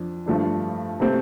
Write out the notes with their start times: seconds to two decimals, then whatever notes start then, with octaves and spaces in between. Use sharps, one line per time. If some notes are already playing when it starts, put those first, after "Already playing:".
Already playing: F2 D4
0.26 G2 F3 A3 D4
1.00 C3 A3 C4